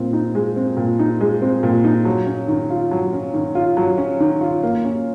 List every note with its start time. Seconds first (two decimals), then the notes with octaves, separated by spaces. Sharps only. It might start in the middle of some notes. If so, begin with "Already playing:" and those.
Already playing: A#2 C4
0.13 D#4
0.35 G#3
0.56 C4
0.77 A#2
0.99 D#4
1.21 G#3
1.42 C4
1.63 A#2
1.84 D#4
2.05 F#3
2.27 C#4
2.48 D#3
2.70 F4
2.91 F#3
3.13 C#4
3.34 D#3
3.55 F4
3.77 F#3
3.98 C#4
4.20 D#3
4.41 F4
4.63 A#3
4.85 C#4